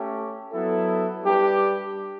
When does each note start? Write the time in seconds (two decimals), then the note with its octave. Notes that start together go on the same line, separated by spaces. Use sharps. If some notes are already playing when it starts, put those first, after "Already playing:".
Already playing: A3 C#4 G4
0.51 F#3 B3 E4 A4
1.23 G3 D4 G4 B4